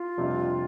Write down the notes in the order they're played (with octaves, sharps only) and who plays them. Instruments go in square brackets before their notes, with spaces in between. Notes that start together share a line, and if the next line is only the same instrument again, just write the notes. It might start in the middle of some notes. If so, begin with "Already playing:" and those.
Already playing: [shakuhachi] F4
[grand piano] F1 F2 C3 G3 D4